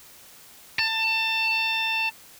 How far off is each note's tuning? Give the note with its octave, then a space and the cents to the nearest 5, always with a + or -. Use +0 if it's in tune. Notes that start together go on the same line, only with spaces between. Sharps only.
A5 +25